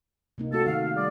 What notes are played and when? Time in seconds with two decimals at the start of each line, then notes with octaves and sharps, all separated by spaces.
0.38 C3 A#3 D#4
0.53 A3 A#3 C4 F#4 A4
0.66 D#3 F5
0.95 G3 G#4 D5